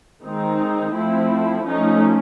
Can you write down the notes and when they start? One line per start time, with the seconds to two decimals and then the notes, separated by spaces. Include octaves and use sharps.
0.24 D#3 G#3 C4 D#4
0.95 F3 A3 C4 E4
1.66 F3 A3 C#4 D#4